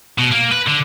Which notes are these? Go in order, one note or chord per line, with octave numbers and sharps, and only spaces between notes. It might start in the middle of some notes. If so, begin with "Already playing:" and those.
B2
A#3
B4
D3